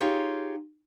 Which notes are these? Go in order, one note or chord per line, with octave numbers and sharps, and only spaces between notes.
D#4 F4 G4 G#4 C#5 F5